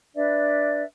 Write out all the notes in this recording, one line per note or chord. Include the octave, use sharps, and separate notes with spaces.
D4 B4 D5 E5